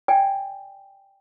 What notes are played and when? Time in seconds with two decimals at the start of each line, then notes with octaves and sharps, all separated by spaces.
0.08 D5 G5 G#5